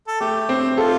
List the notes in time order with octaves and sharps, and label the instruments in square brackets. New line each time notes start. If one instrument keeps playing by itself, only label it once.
[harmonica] A4
[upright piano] A3 [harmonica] G4
[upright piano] C4
[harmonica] F4 [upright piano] A4